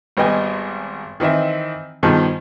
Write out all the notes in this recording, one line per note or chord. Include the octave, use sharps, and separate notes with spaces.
G#1 G3 B3 D#5 G5 G#5
D#3 E3 C4 D#5 E5
G2 B2 D#3 F3 G#4 A5